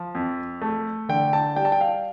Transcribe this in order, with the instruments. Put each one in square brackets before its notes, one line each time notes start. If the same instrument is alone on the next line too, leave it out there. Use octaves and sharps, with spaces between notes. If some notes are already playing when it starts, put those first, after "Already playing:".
Already playing: [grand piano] F3
F2
A3
D3 G5
A5
G3 G5
A5
G5
F5